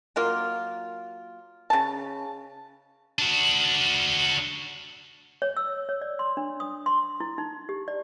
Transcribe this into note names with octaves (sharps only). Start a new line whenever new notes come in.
F#3 A#3 F4
C#3 A5
D4 F#4
C#5
E6
C#5
D5
C6
D4
D#6
C6
E4
D#4
G4
D5